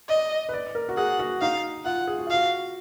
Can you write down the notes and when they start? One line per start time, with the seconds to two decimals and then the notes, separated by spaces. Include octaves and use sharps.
0.09 D5 D#5
0.49 B4
0.53 D5
0.75 A#4
0.89 F#4
0.97 G#4 F#5
1.19 F#4
1.41 D#4 F5
1.85 F4 F#5
2.07 G#4
2.19 F#4
2.27 F4
2.30 F#4 F5